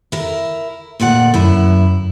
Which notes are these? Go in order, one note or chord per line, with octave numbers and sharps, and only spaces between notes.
E4 A#4
D2 A#2 D5 F#5
F#2 E4